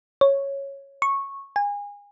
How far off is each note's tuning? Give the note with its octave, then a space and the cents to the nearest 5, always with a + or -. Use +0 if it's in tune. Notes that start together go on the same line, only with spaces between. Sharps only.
C#5 -5
C#6 -10
G#5 -30